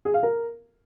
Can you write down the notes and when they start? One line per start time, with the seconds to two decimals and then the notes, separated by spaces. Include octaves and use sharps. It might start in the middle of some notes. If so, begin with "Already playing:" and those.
0.05 G#4
0.14 F5
0.23 A#4